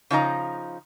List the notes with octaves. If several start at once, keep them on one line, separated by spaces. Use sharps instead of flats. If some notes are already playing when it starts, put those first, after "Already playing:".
C#3 F3 D#4 A#5